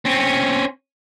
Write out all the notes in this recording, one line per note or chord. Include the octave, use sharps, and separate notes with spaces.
C4 C#4